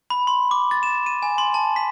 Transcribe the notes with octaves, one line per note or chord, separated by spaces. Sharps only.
B5
C6
D6
A6
E7
D#7
G#5
C6
A5
B6